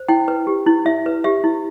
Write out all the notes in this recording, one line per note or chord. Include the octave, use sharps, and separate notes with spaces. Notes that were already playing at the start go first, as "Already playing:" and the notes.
Already playing: C5
E4 G5
B4
G4
E4
E4 E5
B4
G4 E5
E4